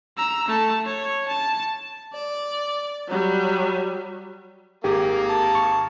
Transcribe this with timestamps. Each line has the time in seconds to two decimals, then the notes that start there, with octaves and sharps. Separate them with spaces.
0.17 A#5 E6
0.48 A3 A5
0.85 C#5
1.28 A5
2.14 D5
3.09 F#3 G3
4.84 G#1 A#3 G4 G#4 A#4 D6
5.29 A5
5.55 C#6